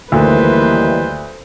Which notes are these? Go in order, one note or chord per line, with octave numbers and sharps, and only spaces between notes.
D2 D#3 E3 G3 A#3 B4 C5